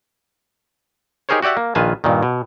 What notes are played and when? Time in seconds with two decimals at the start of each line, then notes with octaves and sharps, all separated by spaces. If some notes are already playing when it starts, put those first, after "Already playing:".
1.29 D#4 G4 G#4 A#4 C5 C#5
1.43 F#4 G4 D5 E5 F#5
1.57 A#3
1.75 A#1 D#3 F4 B4 G#5 A5
2.04 G2 A#2 D#3
2.23 B2